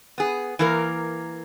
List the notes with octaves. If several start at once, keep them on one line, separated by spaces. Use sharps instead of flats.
B3 G#4
E3 A#3 A#4